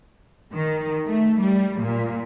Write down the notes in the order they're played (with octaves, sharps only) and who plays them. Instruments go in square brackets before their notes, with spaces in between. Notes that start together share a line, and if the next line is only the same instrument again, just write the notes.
[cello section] D#3
A3
G3
A#2